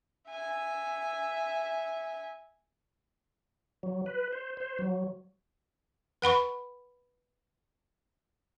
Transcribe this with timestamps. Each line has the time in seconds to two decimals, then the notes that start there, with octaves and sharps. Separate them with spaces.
0.30 E5 G#5
3.83 F#3
4.06 B4
4.33 C5
4.57 C5
4.79 F#3
6.22 B4 F#5 B5 C#6